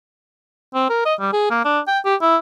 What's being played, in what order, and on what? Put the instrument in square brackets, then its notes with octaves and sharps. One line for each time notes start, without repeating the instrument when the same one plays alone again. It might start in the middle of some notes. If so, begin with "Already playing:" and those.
[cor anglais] C4
A#4
D#5
G3
G#4
A#3
D4
G5
G4
E4